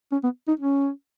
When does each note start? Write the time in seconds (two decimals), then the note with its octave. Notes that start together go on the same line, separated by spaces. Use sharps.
0.12 C#4
0.23 B3
0.48 D#4
0.60 C#4